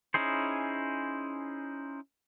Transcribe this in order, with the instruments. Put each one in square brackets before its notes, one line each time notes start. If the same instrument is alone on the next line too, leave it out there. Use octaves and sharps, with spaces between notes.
[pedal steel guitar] C#4 D#4 E4 G#4 C5